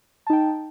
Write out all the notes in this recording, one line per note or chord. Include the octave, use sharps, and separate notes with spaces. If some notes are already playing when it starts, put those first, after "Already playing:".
D#4 G5 A5